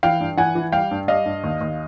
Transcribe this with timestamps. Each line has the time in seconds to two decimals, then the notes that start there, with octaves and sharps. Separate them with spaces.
0.03 E3 F5 G5
0.20 G2
0.37 E3 F#5 G#5
0.55 E3
0.72 G3 F5 G5
0.91 G2
1.08 G3 D#5 F5
1.26 G2
1.44 D#2
1.61 D#2